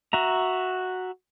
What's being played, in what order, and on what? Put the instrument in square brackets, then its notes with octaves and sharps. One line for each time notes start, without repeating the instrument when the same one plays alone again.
[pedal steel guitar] F#4 E5 A#5